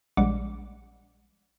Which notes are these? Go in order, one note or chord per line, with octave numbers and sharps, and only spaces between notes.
A#1 G3 G#3 F#5 D6